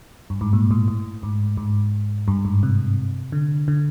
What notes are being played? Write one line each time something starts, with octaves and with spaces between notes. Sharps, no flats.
G2
G#2
A#2
A2
A2
G#2
G#2
G2
G#2
C3
D3
D3